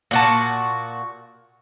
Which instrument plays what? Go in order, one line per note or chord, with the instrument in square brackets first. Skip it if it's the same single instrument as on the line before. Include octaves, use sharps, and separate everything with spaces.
[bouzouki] A#2 F#4 A5